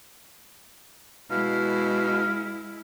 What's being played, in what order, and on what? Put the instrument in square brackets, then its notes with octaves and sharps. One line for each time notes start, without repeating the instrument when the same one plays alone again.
[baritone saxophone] B2 [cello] G#3 E4 [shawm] F5